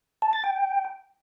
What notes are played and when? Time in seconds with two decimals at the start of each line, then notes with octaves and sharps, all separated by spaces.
0.22 A5
0.33 A6
0.44 G5